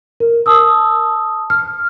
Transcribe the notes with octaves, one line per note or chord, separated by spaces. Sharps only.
A#4
A5 D#6 E6
F6